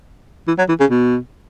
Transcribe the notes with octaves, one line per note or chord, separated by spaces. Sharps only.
E3
F#3
E3
C#3
B2